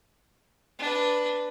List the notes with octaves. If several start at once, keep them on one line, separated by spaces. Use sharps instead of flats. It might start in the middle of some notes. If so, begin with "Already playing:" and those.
D4 B4